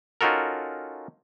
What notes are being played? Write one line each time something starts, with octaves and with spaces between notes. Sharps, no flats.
C#4 D#4 F4 F#4 A4 A#4